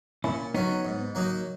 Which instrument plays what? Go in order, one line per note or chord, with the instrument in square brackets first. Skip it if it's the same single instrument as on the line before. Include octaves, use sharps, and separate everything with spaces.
[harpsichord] A#2 [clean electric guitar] C#4 E4
[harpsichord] F#3 C#4 [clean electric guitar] B3 D#4
[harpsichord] G#2
F#3 A#3 D#4